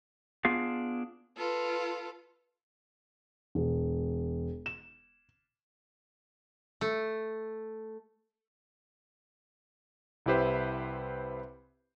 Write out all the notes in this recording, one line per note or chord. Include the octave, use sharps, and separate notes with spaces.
B3 D4 F4 G#4 F5
F4 A4 B4
E1
E7
A3
C2 C4 E4 G4 B4 C5